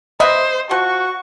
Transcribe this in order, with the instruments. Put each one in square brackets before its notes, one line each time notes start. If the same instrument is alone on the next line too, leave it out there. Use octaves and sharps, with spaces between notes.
[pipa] B3 B4 E5 [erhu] C5 [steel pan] D#5
[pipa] F3 [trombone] F#4 [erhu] C#6